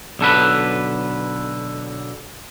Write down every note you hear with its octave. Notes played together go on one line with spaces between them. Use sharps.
B1 D3 A4 B4